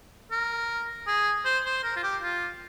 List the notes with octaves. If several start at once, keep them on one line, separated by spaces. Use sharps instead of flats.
A#4
G#4
C5
C5
A#4
F4
G4
F4